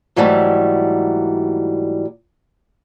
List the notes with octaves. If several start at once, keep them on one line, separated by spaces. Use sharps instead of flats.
G#2 E3 F#3 G3 A3